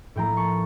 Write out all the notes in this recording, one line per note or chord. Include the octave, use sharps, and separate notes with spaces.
A2 F3 A#3 E4 G5 A#5
A5 C#6